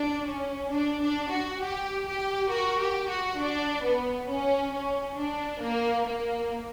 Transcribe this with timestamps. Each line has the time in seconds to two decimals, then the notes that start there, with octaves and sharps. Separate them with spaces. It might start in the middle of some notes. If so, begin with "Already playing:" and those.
Already playing: D4
0.26 C#4
0.71 D4
1.01 D4
1.31 F#4
1.60 G4
2.05 G4
2.49 F#4 A#4
2.78 G4
3.08 F#4
3.38 D4
3.82 B3
4.28 C#4
4.72 C#4
5.16 D4
5.60 A#3
6.05 A#3